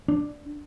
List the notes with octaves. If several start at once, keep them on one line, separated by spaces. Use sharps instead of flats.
D4